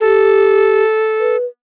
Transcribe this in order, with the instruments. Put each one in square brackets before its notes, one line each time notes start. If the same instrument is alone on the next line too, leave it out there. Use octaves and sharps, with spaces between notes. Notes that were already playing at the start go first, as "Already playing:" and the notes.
[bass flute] G4 [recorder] A4
[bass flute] B4